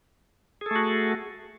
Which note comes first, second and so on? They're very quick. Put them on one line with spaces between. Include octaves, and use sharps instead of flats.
G#4 A4 A3 F#4